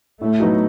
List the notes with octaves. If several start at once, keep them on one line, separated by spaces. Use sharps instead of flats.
A2 A3
F#3 B3 D#4 F#4